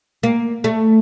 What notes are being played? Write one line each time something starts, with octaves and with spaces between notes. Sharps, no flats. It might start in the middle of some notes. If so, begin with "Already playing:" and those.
A#3
A3